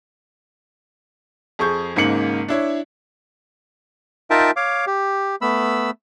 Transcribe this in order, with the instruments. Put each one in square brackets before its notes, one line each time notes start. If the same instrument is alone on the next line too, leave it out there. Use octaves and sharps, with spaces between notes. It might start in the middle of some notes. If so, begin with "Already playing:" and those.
[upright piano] F2 G#4 C#6 G6
G#1 G#2 C#3 A#3 C#7 F#7
D4 E4 C#5
[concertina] D#4 F4 A#4 E5 G5 A5
C#5 F5 D6
G4
A3 B3 B5 E6